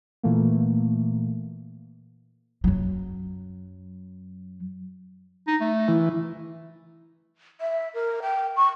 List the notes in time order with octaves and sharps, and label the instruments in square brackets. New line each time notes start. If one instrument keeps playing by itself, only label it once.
[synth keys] A#2 E3 A3 A#3
[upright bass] F#2 F#3
[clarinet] D#4
A3
[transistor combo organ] E3
[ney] E5
A#4
G5
C#6